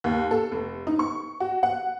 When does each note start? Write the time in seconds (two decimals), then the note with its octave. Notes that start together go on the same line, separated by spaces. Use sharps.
0.04 D#2
0.31 A4
0.52 F1
0.87 D#4
0.99 C#6
1.40 F#4
1.63 F#5